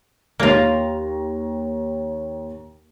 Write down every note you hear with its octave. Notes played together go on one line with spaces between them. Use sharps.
D#2 A#3 F4 C#5 A#6